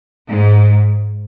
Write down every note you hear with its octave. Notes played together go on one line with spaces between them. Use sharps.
G#2